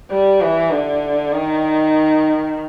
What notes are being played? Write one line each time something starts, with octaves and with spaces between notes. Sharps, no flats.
G3
E3
D3
D#3